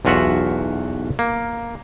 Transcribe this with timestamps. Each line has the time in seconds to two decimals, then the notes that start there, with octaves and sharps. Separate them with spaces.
0.05 B1 E2 F4 F#4 E5 F#5
1.19 A#3